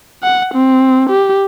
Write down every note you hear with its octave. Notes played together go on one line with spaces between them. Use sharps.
F#5
C4
G4